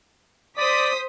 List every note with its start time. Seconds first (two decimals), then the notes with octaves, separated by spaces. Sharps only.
0.58 C5 D5 D#6 B6